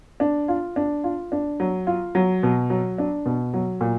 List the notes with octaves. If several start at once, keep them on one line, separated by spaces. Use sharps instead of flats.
D4
F4
D4
F4
D4
F#3
F4
F#3
B2
F#3
D4
B2
F#3
A#2